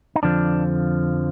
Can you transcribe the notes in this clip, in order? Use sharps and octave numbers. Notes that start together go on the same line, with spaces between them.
D#4
F2 D3 F3 D4